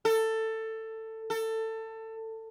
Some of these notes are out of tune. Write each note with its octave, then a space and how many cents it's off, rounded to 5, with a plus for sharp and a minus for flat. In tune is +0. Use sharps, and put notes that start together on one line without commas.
A4 +15
A4 +20